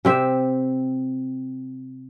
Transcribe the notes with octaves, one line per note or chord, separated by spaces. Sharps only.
C3 C4 E5